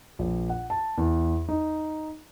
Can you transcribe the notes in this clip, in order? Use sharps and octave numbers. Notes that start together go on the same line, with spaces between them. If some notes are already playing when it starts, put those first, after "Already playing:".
A#1
F#5
A5
E2
D#4